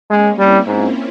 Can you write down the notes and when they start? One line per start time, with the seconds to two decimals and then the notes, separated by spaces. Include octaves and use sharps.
0.10 G#3 A#3 C#4
0.38 G3 C4 E4
0.66 G#2 C#4 F4